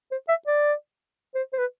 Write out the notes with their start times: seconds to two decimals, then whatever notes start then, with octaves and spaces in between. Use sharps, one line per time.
0.11 C5
0.28 E5
0.47 D5
1.35 C5
1.53 C5
1.58 B4